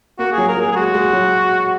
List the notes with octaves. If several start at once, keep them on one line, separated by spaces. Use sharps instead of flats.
A#3 F#4
G#4
F#3
A#4
F#3 G#4
G#4
G#3 F#4
G#3
F#3